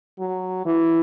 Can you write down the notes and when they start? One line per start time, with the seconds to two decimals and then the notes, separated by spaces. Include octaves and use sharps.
0.19 F#3
0.65 E3